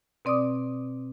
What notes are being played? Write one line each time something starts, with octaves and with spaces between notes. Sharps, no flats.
B2 C4 D5 D6 D#6